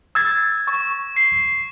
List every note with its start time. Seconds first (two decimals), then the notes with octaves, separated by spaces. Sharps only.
0.15 E6 G#6 A6
0.67 C#6
1.16 C7